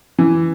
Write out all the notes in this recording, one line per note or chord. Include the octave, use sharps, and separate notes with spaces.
E3